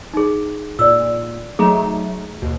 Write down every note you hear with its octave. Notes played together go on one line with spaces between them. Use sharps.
D#4 G#4
A#2 D5 E6
F#3 A3 D#4 G#4 A#5
D#2 B2